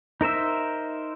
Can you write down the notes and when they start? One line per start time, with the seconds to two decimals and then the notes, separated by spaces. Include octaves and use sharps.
0.21 D#4 A#4 C5 E5